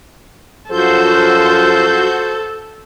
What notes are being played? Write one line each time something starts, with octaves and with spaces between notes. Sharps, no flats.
F#2 F3 F4 F#4 A4 C5 G6